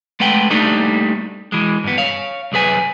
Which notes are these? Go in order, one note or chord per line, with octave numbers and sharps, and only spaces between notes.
G#3 A3 B4 F#5 G5
G3 A3 A#3 D4 D#4 A4
E3 G#3
G2 B3
C#5 F5
C2 F#2 G#4 B4 G#5